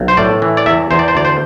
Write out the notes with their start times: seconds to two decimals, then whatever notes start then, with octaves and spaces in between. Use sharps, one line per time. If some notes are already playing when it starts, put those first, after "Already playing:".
Already playing: B1
0.08 C5
0.17 A2 D5
0.42 E3
0.57 D5
0.66 E2 E5
0.91 E2 C5
0.99 D5
1.08 C5
1.15 D2 D5
1.25 C5